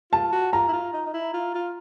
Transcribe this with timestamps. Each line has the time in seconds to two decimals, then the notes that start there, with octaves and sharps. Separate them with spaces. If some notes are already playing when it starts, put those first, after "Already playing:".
0.11 F4 A5
0.32 F#4
0.52 F4 A#5
0.68 E4
0.73 F4
0.93 D#4
1.06 D#4
1.13 E4
1.34 F4
1.55 F4